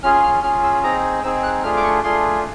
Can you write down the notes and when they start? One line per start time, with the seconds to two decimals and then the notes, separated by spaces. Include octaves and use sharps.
0.03 C#4 F4 G#4 F6
0.23 F6
0.43 C#4 F4 G#4 F6
0.63 E6
0.83 C4 D#4 G#4 A#5
1.24 C4 D#4 G#4 E6
1.43 F#6
1.63 A3 D4 F4 G#4 F6
1.77 D6
1.84 C#6
2.04 A3 D4 F4 G#4 C6